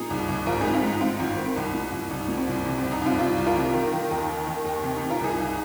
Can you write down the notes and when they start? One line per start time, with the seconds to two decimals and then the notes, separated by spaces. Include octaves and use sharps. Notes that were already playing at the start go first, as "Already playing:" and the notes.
Already playing: A#2 D#4 G#4
0.10 C2
0.28 C2
0.46 G#1 F4 A#4
0.61 G#2 D#4 G#4
0.74 C4 F4
0.83 G#2 D#4
1.01 G#2 C4 F4
1.19 G#1
1.38 D#3
1.46 C4
1.55 C2 D#4
1.74 A#2
1.92 C2
2.10 C2 D#4
2.28 A#2
2.37 C4
2.47 C2
2.65 C3
2.78 C4
2.84 C2
2.92 D#4
3.02 C2 C4 F4
3.19 C2 C4 F4
3.38 C2
3.46 F4 A#4
3.56 C3
3.74 D#3
3.92 D#3
4.11 D#2
4.29 D#3
4.47 D#3
4.65 D#2
4.83 C3
4.97 D#4
5.01 C3
5.10 F4 A#4
5.20 C2 D#4 G#4
5.38 C2